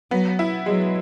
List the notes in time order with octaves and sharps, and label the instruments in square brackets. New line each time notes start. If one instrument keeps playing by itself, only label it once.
[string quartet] F#3 [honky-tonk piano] B3
[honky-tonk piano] E4
[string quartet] F#3 [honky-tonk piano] G#3